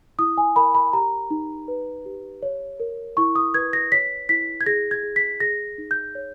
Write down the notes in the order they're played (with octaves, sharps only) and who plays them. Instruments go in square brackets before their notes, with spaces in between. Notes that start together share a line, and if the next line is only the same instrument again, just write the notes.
[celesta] E4 D#6
G#5
A#4 B5
B5
G4 A#5
D#4
B4
G4
C#5
A#4
E4 C#6
D#6
B4 G#6
A#6
C#5 B6
E4 B6
G#6
G#4 A#6
G#6
G#4
B6
G#4 A#6
D#4
G6
C#5